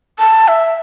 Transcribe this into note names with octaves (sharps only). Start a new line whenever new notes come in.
A5
E5